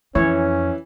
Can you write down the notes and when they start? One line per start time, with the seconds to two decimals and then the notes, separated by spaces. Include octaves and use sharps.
0.15 F2 E3 C#4 C#5